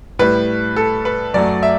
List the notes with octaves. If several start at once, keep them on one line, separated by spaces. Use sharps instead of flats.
A2 G3 B4
A4
B4
F#2 F#3 A3 D5
E5